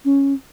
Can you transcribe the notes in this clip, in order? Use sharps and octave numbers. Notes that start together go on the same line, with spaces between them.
C#4